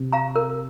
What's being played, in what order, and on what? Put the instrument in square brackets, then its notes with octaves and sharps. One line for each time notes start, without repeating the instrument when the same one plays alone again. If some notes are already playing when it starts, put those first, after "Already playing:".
Already playing: [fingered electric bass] C3
[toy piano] F5 A#5
A#4